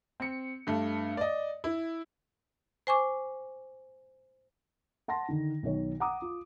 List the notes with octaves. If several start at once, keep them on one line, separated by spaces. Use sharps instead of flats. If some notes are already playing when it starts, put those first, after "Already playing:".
C4 C#7
G2 A3
D5 D#5
E4
C5 G#5 C#6 D6
F#5 A5 C6 A#6
D3 D#3
B1 D#3 C#5
F#5 A#5 D6 D#6
F4